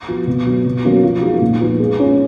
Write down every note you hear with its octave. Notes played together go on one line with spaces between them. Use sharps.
F3 B3 F#4
B2
F#3 B3
B2
F#3 A#3 C#4 F#4
F3
G#3 D#4 F#4
A#2
F3 B3 F4
G#3
C#4 F4